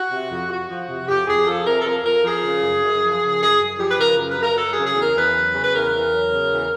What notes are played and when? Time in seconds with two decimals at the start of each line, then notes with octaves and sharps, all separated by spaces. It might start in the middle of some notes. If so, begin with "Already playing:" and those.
Already playing: F#4
0.12 C3
0.31 F2
0.50 F2 F#4
0.70 F3
0.89 C3
1.08 F2 G4
1.27 F2 G#4
1.47 F3 A4
1.66 C3 A#4
1.79 A4
1.85 F2 A#4
2.05 F2 A#4
2.24 F3 G#4
2.44 C#3
2.63 F#2
2.83 F#2
3.02 F3
3.22 C#3
3.41 F#2 G#4
3.60 F#2
3.79 F3 G4
3.89 B4
3.99 C#3 A#4
4.18 F#2
4.28 B4
4.38 F#2 A#4
4.57 F#3 A4
4.71 G#4
4.76 C#3
4.86 G#4
4.96 E2 A#4
5.15 E2 B4
5.35 F#3
5.54 C#3
5.62 B4
5.73 E2 A#4
5.93 E2
6.12 F#3
6.31 C#3
6.51 E2